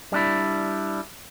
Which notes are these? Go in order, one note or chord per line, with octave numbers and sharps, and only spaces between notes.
G3 D4 E4